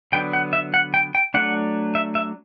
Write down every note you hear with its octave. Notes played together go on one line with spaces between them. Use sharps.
D3 F#3 B3 D4 G5
F#5
E5
F#5
G5
G5
F#3 A3 D4 F#5
E5
E5